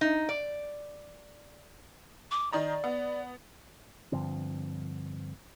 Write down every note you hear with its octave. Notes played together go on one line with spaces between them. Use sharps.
D#4
D5
D6
D#3 D5 D#5 A#5
B3
G2 D3 F3 C4